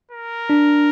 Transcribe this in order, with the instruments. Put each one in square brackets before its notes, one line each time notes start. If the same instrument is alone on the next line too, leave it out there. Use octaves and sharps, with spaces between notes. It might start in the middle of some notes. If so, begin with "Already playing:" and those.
[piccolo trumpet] A#4
[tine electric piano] D4